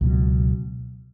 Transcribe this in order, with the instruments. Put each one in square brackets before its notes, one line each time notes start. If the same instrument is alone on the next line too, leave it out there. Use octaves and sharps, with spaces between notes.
[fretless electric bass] C#2 B2 F#3